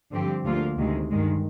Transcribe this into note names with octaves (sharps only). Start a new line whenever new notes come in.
G2 D3 F3 C4 G4
D2 D3 F3 A#3 F4
D2 C3 D#3 G#3
G2 D#3 G#3